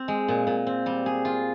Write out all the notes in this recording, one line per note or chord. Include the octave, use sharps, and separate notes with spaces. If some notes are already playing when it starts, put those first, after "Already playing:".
Already playing: C4
G#3
A#2
A#2
C4
G3
G#4
F4